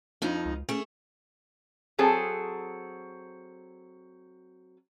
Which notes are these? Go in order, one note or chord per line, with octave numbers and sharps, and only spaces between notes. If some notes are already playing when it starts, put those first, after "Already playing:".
F2 F3 D4 D#4
C#2
A3 C#4 G#4
F#3 C4 G#4 A4